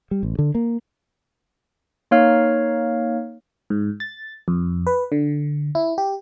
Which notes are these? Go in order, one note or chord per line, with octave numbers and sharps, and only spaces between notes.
G3
A1
D3
A#3
A#3 D#4 C#5 F5 F6
G#2
A6
F2
B4
D3
E4
G4